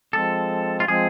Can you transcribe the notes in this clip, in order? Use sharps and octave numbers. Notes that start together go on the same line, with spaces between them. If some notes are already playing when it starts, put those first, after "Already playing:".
F3 G#3 C4 A4
F4
F3 G#3 C4 G#4